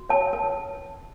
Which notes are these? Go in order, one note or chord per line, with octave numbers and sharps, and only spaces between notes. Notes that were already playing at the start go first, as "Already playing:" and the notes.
Already playing: F#4
C#5 A5
B4 A5